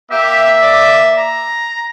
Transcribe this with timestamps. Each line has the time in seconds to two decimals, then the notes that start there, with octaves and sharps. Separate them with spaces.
0.11 A#3 G4 E5
0.62 D5
1.18 A#5